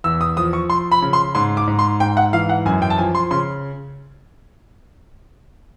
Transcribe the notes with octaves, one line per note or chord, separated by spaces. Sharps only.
E2 E6
D#6
F3 D#6
C#6
F3 C6
B5
C#3
C6
G#2 C6
D6
G#2
C6
G#2 G5
F#5
E3 F5
F#5
F#2 G#5
G5
A5
F3 G#5
C6
C#3 C6